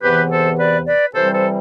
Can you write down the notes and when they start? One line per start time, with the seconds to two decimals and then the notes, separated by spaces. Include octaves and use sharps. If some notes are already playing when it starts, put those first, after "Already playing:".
0.03 E2 C3 E3 B3 G4 B4
0.31 A4 C5
0.58 B4 D5
0.87 B4 D5
1.15 C3 E3 G3 C4 A4 C5
1.33 A4 C5